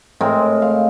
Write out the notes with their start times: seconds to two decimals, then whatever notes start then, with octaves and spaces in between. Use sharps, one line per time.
0.21 A2 G#3 C4 A#4
0.62 F5